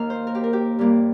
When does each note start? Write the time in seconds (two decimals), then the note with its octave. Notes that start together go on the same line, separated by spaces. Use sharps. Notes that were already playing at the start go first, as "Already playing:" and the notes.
Already playing: D#2 D#3 A#3 F5
0.10 C5
0.27 A#4
0.35 G4
0.44 A#4
0.53 G4
0.79 G2 G3 A#3